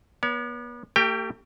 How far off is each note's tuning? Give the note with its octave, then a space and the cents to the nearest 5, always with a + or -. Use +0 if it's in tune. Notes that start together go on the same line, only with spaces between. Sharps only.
B3 -35 C#5 +40
A3 +45 G4 +0 G5 +25